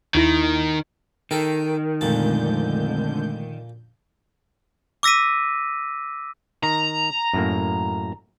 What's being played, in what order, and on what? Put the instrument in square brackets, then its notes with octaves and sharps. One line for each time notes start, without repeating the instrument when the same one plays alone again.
[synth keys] D#2 E4 A#6 [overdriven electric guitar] D#3
[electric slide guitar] D#3 [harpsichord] A4 A#4 G5
[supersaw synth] F2 D3 G6 [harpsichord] A#2 A5 [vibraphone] G#3 A3
[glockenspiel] D6 E6 A#6 B6 D#7
[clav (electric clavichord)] D#3 [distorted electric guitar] A#5
[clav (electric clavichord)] F#2 A2 A#3